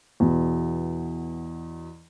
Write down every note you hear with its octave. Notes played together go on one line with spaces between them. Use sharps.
E2 B2